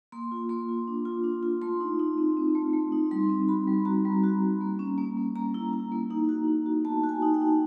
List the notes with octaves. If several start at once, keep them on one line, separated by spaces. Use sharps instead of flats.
A#3 C6
F4
A#3 C6
F4
D4
F4
D4
F4
A3 C6
D#4
D#4
C4
C4
A3
A3
D#4
G3 C6
C4
F#4 B5
G3
F#4 A#5
G3
F#4
G3
A#3
C#4
A#3
A#3
A#3 A#5
E4
E4
A#3
D#4
F#4
D#4
F#4
B3 A5
F#4
G#5
D#4
G5
D#4